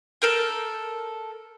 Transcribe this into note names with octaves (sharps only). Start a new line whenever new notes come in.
A4 A#4 G6